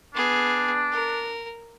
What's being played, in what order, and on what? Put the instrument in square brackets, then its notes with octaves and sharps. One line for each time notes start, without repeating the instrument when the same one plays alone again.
[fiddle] B3 G#4 [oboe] D4
[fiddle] A#4